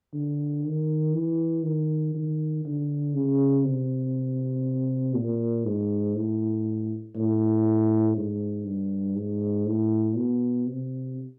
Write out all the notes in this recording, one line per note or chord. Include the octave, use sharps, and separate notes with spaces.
D3
D#3
E3
D#3
D#3
D3
C#3
C3
A#2
G#2
A2
A2
G#2
G2
G#2
A2
B2
C3